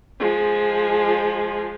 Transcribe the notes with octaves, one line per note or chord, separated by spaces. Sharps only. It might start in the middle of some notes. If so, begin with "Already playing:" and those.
F3 G#3